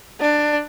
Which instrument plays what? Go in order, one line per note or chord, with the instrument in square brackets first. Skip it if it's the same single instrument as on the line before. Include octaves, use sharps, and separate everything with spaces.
[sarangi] D4